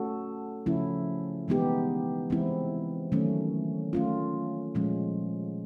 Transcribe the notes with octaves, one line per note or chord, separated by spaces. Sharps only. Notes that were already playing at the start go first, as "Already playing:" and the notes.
Already playing: A3 C#4 F#4 A4
C#3 F3 A3 C#4 E4
E3 G#3 B3 D#4 G4
E3 G#3 C4 E4
D#3 F#3 A3 C#4
A3 C#4 F4
A#2 F3 G#3 C#4